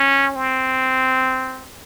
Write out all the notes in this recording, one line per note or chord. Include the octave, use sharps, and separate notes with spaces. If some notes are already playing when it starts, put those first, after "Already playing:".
Already playing: C#4
C4